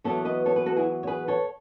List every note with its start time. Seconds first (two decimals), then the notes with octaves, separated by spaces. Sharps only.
0.04 E2 B2 F#3 B3 A4 C#5
0.25 B4 D#5
0.46 A4 C#5
0.56 G#4 B4
0.66 F#4 A4
0.76 E4 G#4
1.03 C#5
1.07 G#4 B4
1.28 A4 C#5